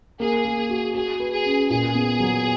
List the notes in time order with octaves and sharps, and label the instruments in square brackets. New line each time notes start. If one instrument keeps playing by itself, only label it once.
[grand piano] A#3 [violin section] G#4
[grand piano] A#3
F#4
[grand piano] F#4 [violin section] G#4
[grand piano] B4
[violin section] G#4
[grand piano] C#4
[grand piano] A#2 [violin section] G#4
[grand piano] B3
F#3